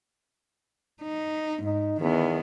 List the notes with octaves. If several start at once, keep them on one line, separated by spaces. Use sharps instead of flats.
D#4
G#2 D#4
E2 D#3 B3